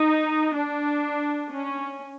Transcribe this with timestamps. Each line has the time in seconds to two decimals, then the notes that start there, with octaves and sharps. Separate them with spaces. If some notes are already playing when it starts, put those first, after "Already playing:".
Already playing: D#4
0.56 D4
1.52 C#4